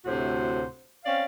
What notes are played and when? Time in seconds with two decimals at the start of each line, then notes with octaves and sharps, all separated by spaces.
0.05 D2 A2 C3 F#4 C5
1.05 C4 C#4 D5 F5